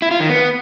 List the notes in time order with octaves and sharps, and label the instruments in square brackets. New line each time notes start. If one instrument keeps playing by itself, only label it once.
[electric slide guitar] E4
F4
D#3
B3